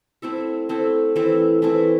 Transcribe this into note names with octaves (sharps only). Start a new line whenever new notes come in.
A3 C4 E4 A4
A3 C4 E4 A4
E3 A3 C4 E4
E3 A3 C4 E4